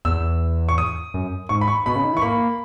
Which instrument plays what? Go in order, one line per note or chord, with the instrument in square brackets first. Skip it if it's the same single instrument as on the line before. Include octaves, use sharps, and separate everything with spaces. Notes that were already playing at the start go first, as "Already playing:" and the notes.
[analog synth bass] E2 [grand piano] E6
[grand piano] C#6
D#6
[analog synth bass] F#2
[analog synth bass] G#2 [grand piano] C#6
[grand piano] B5
C#6
[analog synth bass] B2 [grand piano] B5
[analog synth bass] C#3
D#3
E3
[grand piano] C#6
[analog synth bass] A#3 [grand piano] B5